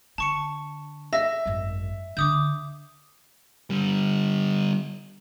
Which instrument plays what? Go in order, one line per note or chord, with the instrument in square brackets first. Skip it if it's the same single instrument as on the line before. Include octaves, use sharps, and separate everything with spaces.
[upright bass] D3 [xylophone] A5 C#6 C#7
[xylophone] D#5 A#6 [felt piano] E5
[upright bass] G#1 F#2
[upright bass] D3 D4 [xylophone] D6 D#6 G6
[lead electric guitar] D3 G3